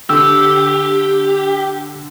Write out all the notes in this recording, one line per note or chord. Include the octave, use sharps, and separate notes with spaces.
D3 G4 E6